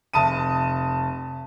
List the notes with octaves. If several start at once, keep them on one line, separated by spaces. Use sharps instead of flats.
F1 A5 D#6 D#7